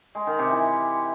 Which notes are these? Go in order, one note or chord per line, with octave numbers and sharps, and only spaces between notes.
G#3
D#3
C3
E3